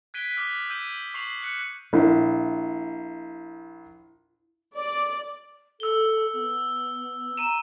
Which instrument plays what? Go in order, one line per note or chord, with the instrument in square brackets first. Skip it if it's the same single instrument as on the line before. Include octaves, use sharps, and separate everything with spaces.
[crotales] F#6 G#6 B6 D7 D#7 G7
D6 D#6 F6 D#7
E6 G6 D#7
C#6 C7 F7 F#7
F#6 C#7
[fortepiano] A#1 [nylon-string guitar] E4
[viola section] D5
[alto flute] A4 [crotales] E6 G7
[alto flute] B3
[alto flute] A#5 [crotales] D#7 E7